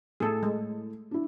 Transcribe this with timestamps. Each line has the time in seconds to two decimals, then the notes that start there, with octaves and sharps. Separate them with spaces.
0.20 A2 A3 G#4 A4
0.43 G#3
1.11 D4 E4